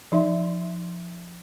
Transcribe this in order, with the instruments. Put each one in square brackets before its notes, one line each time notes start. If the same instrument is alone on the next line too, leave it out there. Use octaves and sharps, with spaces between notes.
[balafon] F3 D#4 E5 C6